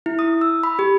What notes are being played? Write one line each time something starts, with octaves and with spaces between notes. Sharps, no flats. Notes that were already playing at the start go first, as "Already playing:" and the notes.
E4
D#6
E6
B5
G4